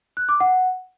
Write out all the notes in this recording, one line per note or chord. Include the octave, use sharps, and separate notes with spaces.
F#6
D6
F#5